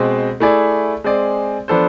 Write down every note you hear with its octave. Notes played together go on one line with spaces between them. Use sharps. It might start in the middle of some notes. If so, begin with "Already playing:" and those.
Already playing: B2 G#3 C4
A3 E4 G#4 D5
G#3 C4 G#4 D5
F3 B3 D4 A4 C5